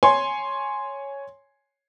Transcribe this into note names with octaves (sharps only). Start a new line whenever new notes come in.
C#5 G#5 C6